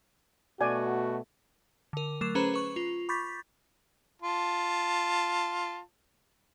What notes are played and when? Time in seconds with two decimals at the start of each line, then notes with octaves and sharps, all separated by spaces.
0.61 B2 A3 F#4 D5 G#5
1.93 D3 A#4
2.21 F#3 A3 A#4 D6 C7 E7
2.35 C#4 G#4 B4 C5 A#5 B5
2.54 B4 C#6
2.76 F4
3.09 B5 C#6 D6 G6 A6 B6
4.22 F4 A5